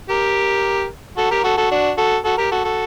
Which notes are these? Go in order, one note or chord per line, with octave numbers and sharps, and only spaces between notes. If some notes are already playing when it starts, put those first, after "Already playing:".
G4 A#4
F#4 A4
G4 A#4
F#4 A4
F#4 A4
D4 F#4
F#4 A4
F#4 A4
G4 A#4
F#4 A4
F#4 A4